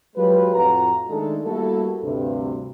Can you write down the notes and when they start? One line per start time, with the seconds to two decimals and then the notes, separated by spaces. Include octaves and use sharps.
0.16 F#3 G#3 F4 G4 B4
0.54 F2 A2 F4 F#4 A#5
1.09 D#3 G#3 A3 D4 A4
1.44 G3 A3 A#3 E4 F#4 A4
2.03 D2 G2 C3